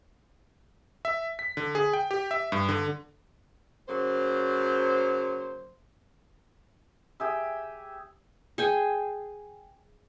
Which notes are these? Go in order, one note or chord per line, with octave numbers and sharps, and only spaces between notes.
E5
B6
D3
G#4
G5
G4
E5
G2
D3
C#3 F#3 A#3 C5
G4 G#4 E5
G#4 G5 G#5